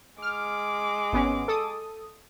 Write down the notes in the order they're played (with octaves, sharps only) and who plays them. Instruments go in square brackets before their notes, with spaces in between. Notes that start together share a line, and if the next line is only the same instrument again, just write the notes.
[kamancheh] G#3 D6 [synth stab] F6
[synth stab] G#1 B3 C#4
A4 D#6